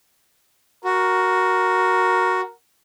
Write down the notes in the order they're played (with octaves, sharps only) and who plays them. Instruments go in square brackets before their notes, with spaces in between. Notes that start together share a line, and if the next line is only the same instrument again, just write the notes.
[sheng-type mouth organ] F#4 [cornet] A#4